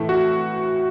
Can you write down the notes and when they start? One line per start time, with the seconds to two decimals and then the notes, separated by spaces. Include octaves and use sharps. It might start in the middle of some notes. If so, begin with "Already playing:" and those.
Already playing: A2 E3 A3 E4
0.09 F#4